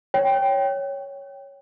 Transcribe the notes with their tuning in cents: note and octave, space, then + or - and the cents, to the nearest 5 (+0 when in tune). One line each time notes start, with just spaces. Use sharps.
C#5 +0 G5 +0